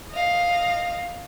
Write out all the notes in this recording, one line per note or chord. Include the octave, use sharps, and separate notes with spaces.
D#5 F5